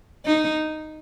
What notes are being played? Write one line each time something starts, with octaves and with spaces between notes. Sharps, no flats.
D#4